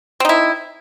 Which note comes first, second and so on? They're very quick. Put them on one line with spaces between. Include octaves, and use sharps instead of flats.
C4 D#4 E4